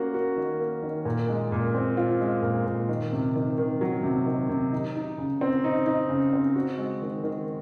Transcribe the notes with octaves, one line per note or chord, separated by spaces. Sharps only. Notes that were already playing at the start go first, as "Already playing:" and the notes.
Already playing: A#3 C#4 F#4
F#4
D#3
A#3
D#3
A#2
G#3
A#2
C4
F4
G#3
A#2
A#2
D#3
C3
D#3
D#3
F#3
C3
D#3
C3
D#4
D#4
C#3
C4
D#4
D#4
C#3
C4
F#4
G#3
D#3
D#3